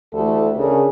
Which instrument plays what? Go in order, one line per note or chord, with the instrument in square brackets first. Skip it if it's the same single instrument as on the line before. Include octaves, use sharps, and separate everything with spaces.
[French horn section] D2 E3 A3 G4 A4
C#3 D4 G#4 A#4